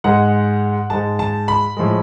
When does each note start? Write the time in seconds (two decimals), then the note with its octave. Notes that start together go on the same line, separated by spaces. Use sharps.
0.04 G#2 G#3 F#5
0.90 G#2 G#3 A5
1.19 A5
1.48 B5
1.77 A2 F3 G#3